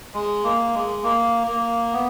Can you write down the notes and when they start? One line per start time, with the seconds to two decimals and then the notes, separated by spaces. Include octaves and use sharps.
0.14 G#3
0.44 A#3
0.74 G#3
1.03 A#3
1.47 A#3
1.92 B3